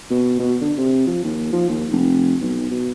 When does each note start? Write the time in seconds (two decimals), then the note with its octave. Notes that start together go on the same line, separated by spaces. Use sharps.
0.10 B2
0.39 B2
0.61 D3
0.78 C3
1.07 F3
1.24 D#2
1.53 F3
1.69 D#2
1.92 F1
2.41 B1
2.71 B2